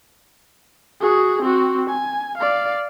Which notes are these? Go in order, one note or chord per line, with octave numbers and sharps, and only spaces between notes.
F#4 G#4
C4 F#4
G#5
D5 F5